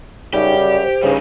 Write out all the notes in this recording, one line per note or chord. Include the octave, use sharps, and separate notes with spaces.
F#2 C#3 G3 D#4 G4
D5
C5
G2 C#3 G3 D#4